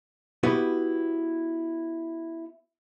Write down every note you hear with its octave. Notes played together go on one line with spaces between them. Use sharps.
B3 E4 F#4 G4 B4